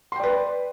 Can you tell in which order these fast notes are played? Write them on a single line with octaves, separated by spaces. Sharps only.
C6 G5 D5 B4